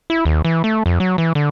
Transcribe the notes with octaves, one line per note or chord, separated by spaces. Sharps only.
E4
D#2
E3
A3
F2
F#3
E3
D3